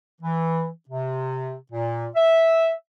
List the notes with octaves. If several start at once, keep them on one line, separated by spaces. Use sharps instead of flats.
E3
C3
A#2
E5